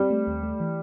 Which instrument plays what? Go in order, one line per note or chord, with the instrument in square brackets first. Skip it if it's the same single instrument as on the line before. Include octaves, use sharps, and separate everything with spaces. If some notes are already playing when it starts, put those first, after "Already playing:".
Already playing: [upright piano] G3 [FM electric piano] C4
[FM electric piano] A3
D#2
A3
E3